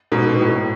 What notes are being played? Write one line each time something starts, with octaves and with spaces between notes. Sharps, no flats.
G#2 B2
B2
A2
A2